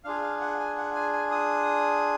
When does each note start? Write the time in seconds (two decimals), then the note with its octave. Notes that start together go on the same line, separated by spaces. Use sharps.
0.04 D4 F4 G#4 F5
0.23 F5
0.41 F#5
0.60 G#5
0.78 F#5
0.95 G#5
1.13 G#5
1.31 D#6